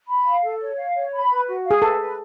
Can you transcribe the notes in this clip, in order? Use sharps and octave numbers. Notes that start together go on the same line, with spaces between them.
B5
F5
A4
C#5
F5
C#5
B5
B4
F#4
F5
G#4
A4 B4
B4